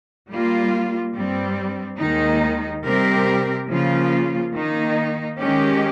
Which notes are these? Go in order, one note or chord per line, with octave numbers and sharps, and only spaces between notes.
G3 A#3 F4
G2 G3 C4
D#2 D#3 G#3 D#4
C3 G3 C4 G4 A#4
C#3 F3 A#3 F4
D#3 A#3 D#4
D#3 G#3 C#4 G4